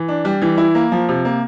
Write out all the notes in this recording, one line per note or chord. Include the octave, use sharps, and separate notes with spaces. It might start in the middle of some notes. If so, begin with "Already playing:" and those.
Already playing: E3
D4
G3
E3
E4
A#3
F3
C3
A#3